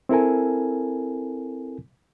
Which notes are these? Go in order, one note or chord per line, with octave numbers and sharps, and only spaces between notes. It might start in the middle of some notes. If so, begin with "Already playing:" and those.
C4 E4 A4 A#4 G#5